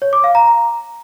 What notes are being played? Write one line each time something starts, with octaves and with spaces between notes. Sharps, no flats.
C#5
D6
F5
A#5